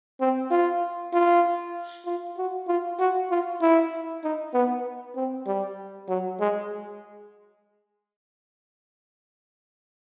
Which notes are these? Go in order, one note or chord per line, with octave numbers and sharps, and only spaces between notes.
C4
F4
F4
F4
F#4
F4
F#4
F4
E4
D#4
B3
C4
G3
F#3
G#3